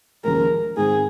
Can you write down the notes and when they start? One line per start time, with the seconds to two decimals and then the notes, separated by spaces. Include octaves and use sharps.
0.24 D#2 C#3 F3 G#3 A#4
0.77 G#2 D#3 G#3 C4 G#4